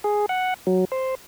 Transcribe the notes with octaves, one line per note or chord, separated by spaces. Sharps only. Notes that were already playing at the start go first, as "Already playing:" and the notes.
G#4
F#5
F#3
C5